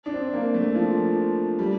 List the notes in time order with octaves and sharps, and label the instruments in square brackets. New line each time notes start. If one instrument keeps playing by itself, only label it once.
[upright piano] D4
C4
A#3
A3
F3
G3